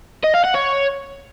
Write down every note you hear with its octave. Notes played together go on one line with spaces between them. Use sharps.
D#5
F5
F#5
C#5